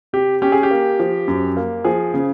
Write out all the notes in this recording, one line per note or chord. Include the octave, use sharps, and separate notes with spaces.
C3 G4
C#4 G4
G#4
G4
A#3
F3
F#2
A#3
F3 G#4
C#3